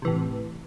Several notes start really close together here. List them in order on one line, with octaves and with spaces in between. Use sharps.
C3 E3 A2